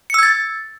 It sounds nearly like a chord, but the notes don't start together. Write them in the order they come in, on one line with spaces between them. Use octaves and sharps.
C#7 E6 G#6 A6